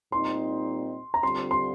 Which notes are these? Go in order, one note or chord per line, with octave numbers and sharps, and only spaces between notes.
A#2 G3 C4 D#4 C6
A#5
D3 G3 C4 F4 C6
C6